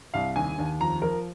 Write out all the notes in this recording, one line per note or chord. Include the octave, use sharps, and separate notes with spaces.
C2 F5
D#2 G#5
D#2
F2 A#5
F3 A#4